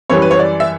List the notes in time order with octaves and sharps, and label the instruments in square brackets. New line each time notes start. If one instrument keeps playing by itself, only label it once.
[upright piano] F#2 E3 G3 C#5
B4
C#5
D5
E5